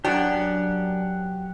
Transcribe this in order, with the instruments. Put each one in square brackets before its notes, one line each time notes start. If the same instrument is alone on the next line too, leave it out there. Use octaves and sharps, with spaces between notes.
[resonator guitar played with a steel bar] F#2 D4 [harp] F#3 C#5 [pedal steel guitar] G4 F#5